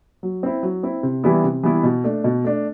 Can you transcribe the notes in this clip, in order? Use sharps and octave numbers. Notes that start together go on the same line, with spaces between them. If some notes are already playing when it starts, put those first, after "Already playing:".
F#3
C4 E4
F#3
C4 E4
C3
E3 G3 B3 E4
C3
E3 G3 B3 E4
B2
A3 D4
B2
A3 D4